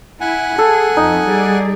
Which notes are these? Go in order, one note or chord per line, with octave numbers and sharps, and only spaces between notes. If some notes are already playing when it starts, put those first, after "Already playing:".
E4 F#5 G#5
G#4 A4
F2 D#4
G3 G#4 D5